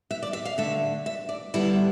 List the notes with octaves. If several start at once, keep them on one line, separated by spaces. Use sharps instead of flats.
E5
D5
E5
F5
D3 A3 E5
E5
D5
D3 G3 B3 E4